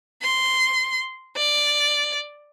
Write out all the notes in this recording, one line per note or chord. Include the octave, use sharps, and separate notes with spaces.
C6
D5